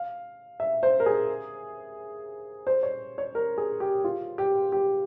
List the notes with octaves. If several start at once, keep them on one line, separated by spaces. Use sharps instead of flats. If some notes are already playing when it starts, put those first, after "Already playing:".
Already playing: F5
E5
C5
A#4
G#4
C5
C#5
C#5
A#4
G#4
G4
F4
G4
G4